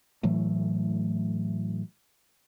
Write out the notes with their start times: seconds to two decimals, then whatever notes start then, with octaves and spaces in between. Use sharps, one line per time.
0.23 A2 E3 F#3 A3